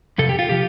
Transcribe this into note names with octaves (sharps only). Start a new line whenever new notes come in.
F2 C3 A4
G4
F4
C3 F3 G4